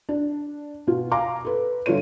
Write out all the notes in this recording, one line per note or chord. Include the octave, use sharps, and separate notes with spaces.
D4
B2 F4
F5 G#5 A#5 D6
A4 B4
G1 F4 A4 C#5 D#7